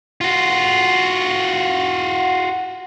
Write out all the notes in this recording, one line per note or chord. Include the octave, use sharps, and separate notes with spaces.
F4 F#4